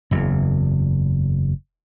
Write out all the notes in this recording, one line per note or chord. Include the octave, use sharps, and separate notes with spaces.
F#1 E2